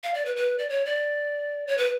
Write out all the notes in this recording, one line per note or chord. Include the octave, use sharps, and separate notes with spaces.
F5
D5
B4
B4
D5
C#5
D5
C#5
B4